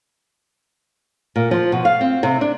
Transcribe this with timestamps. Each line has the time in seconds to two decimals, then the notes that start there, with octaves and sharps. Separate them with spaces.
1.36 A#2
1.51 F3
1.72 B2
1.85 F5
2.01 C4
2.23 C3
2.41 D4